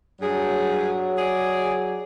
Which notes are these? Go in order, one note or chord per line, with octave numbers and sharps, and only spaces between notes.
G2 F#3 G#4
G#4 D5